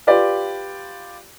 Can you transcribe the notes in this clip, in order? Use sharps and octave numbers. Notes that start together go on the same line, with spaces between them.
F4 G4 B4 D5